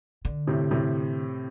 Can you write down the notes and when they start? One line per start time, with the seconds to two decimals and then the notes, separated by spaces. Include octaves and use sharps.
0.25 D3
0.47 A2 C3
0.71 A2 C3